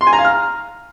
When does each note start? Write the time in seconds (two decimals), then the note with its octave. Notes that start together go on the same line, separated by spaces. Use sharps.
0.01 C6
0.07 G#5
0.13 A#5
0.19 F5
0.25 F6